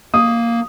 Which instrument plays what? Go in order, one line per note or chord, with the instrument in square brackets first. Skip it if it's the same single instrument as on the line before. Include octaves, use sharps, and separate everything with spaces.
[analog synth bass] A#3 [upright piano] D#6